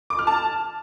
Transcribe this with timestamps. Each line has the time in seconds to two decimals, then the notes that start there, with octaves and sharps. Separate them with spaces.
0.10 D6
0.19 F6
0.27 A5